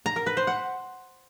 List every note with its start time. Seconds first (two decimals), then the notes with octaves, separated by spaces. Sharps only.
0.06 A#5
0.16 A#4
0.26 B4
0.37 C5
0.47 F#5